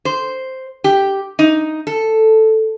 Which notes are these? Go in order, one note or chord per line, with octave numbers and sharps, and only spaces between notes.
C5
G4
D#4
A4